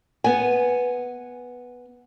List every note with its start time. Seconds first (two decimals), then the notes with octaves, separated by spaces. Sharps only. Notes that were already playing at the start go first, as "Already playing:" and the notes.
0.24 B3 G#5